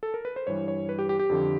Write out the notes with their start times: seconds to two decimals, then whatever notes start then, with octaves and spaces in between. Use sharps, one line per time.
0.03 A4
0.14 A#4
0.25 B4
0.36 C5
0.47 G2 E3 G3 C#5
0.68 C#5
0.89 B4
0.99 G4
1.09 G4
1.19 G4
1.30 F2 D3 F3